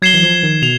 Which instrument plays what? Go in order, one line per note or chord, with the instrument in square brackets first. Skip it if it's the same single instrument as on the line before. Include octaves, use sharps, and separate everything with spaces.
[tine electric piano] F#3 [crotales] G#6 C7 E7 G7
[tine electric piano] E3
F3
D#3
[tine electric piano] B2 [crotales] F7